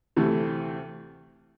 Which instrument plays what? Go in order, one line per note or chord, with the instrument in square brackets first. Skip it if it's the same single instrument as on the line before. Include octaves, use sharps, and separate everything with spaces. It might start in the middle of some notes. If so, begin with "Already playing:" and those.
[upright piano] D2 C3 E3 A3 C4